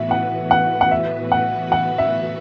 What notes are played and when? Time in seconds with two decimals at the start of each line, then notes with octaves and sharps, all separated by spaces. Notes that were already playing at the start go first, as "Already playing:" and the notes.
Already playing: A2 E3 B3 F#4 B4 E5
0.11 F#5
0.51 F#5
0.81 F#5
0.91 E5
1.32 F#5
1.72 F#5
1.98 E5